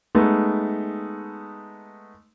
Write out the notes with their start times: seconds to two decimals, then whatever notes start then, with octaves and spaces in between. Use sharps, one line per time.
0.15 G#3 A3 B3 D#4